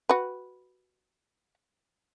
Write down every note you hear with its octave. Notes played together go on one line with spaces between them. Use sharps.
F#4 B4